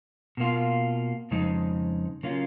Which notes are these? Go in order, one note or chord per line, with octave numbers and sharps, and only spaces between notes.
B2 A#3 F4
F2 C#3 G#3 D#4
C#3 F#3 A#3 C#4 F4